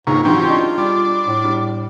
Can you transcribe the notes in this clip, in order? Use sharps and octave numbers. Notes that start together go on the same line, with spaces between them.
C#2 G#2 D#3 A#3 C#4
G#2 E3 F#3 C4 C#4 F4 G4
D4 D#4 G#4
G3 D4
A2
G3